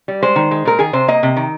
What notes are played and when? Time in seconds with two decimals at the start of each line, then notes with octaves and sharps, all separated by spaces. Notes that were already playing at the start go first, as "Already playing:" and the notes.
0.08 G3
0.23 G#3 C5
0.36 D#3
0.51 G#3
0.65 A#2 A#4
0.79 D#3 G#4
0.93 C3 C5
1.08 A#3 D#5
1.23 C3
1.36 D#3